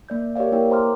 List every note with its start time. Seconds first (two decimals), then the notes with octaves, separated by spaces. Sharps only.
0.09 A#3 D5 G6
0.36 G4 A#4 C#5 D5 F5
0.52 A#3 E4 A#4 C#5 G5
0.70 C5 G5 A#5 C6 D6 F6